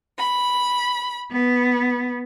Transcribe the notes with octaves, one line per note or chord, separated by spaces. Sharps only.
B5
B3